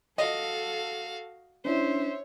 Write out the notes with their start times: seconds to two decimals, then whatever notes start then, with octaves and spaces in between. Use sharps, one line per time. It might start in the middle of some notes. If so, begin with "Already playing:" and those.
0.18 F#4 A4 D#5 F5
1.65 C#4 D4 E4 C5 C#5 E5